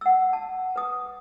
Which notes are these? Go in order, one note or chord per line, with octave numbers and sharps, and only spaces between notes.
F#5 E6
A5
B4 D#6